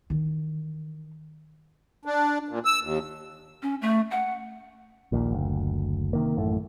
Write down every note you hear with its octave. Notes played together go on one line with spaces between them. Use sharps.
D#3 E3
D4
A#2
E6
D#2
C#4
A3
F#5
A#1 D#2 A#2
F#1 D2
C3 D#3 A#3
A1 F#2 A2 A3